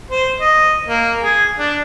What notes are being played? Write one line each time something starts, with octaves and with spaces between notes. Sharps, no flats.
C5
D#5
A#3
G#4
D4